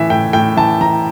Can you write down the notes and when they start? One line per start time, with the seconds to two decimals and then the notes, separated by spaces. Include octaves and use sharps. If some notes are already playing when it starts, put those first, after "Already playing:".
Already playing: A2 E3 E5
0.10 A2 G5
0.33 A2 G5
0.57 E3 A5
0.81 E3 A#5